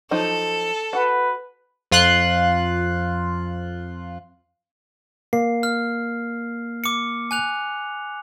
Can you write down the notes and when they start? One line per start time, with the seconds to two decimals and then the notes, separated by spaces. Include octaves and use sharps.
0.11 F3 F#3 D#4 A4
0.93 F#4 B4 F#5
1.91 F2 F4 C6 F#6
5.33 A#3 C7
5.63 F6
6.84 D6 C#7
7.31 G#5 F#6 F7